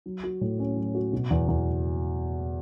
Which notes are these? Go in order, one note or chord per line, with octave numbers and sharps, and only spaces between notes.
F#3
F#4
A2
C#4
F#3
F#4
B2
E2
E2